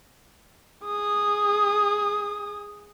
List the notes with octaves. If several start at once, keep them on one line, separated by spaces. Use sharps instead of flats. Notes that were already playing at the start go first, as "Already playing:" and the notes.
G#4 D#6